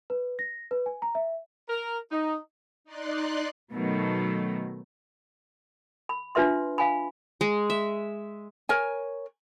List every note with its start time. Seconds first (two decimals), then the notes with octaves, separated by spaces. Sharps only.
0.10 B4
0.39 A#6
0.71 B4
0.86 G#5
1.02 A#5
1.15 E5
1.69 A#4
2.11 D#4
2.84 D#4 D5 C6 F#6
3.74 B2 D#3 F#3 A3
6.09 B5
6.35 D4 F4 B4 E5 C6
6.78 F5 G#5 B5
7.41 G#3
7.70 E5
8.69 A#4 C#5 G#5